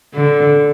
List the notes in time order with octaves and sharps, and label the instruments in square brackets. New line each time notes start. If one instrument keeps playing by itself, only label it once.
[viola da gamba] D3